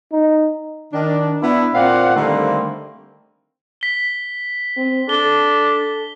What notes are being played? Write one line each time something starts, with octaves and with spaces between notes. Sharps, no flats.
D#4
D#3 D4
B3 D4 E4
A#2 C4 D5 F5 F#5
D3 D#3 G3 A3 A#3 C4
B6 G7
C4
D4 A4 G7